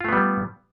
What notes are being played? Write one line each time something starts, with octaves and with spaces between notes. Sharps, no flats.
G3 A3 B3 F4